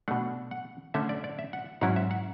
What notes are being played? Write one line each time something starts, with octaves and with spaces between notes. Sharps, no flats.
B2 A3 D4 F#5
F#5
D3 A3 C#4 E5
D5
D5
E5
F#5
G#2 F#3 C#4 E4 F#5
E5
F#5